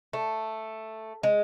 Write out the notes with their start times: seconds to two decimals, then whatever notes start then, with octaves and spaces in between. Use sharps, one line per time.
0.13 A3
1.23 G#3